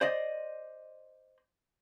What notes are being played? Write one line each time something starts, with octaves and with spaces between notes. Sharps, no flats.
C5 D5 D#5